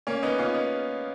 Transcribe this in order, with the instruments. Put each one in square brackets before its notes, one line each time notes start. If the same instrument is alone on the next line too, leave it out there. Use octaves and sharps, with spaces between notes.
[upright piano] A#3 C#4
B3 D#4
C#4 F4
B3 D#4